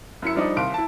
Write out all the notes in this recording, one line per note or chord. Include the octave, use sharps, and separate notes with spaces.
F#2 E4 C#7
F3 G3 D4 D#4
D#1 C2 F5 C6 D7
E4 A5